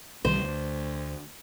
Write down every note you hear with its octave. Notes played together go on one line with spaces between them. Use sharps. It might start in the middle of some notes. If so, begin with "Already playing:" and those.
C2 D#3 G3 C5
D2